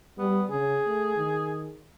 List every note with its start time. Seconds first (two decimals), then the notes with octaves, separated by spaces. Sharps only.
0.18 G3 B3
0.49 C#3 G#4
0.86 A3
1.17 D#3